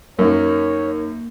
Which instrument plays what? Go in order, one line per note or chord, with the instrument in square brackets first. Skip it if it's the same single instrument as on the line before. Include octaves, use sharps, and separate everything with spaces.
[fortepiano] F#2 [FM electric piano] A#3 [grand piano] D#4 A#4 [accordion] C#5